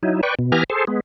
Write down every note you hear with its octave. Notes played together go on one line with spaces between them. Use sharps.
F#3 D#4 E4
B4 D5 G5 C#6
B2
E3 B3 G4 G#5 A#5 F6
G#4 A4 C5
G#3 B3